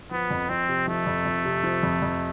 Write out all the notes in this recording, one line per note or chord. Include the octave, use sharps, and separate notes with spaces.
F3 B3
F2
F2 C4
C3
F3 A3
F2
F2
C3
F3
F2
F2